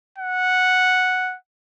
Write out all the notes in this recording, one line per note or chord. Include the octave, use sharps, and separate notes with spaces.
F#5